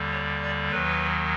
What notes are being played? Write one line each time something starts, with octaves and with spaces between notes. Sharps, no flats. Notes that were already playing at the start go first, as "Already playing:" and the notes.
Already playing: D#2 D3 G3
C#5
D5
D#2 D#3 F#3 B4